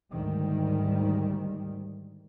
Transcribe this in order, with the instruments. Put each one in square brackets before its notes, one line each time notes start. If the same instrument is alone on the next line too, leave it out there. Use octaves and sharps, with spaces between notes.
[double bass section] D2 G#2 D#3 G3